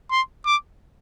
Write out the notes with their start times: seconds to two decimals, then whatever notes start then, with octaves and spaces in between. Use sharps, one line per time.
0.11 C6
0.46 D6